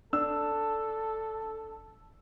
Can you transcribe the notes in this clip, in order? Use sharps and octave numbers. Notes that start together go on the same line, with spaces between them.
D4 A4 E6